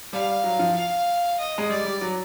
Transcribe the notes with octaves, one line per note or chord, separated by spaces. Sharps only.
G3 F5
F#3
F3
F5
D#5
G#3
G3 D5
G3
F#3